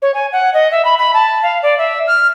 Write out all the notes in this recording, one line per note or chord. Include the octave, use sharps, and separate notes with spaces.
C#5
G#5
F#5
D#5
E5
B5
B5
A5
F5
D5
E5
F6